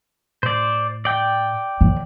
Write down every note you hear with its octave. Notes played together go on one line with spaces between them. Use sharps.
A2 C5 D5
D5 G5
D#2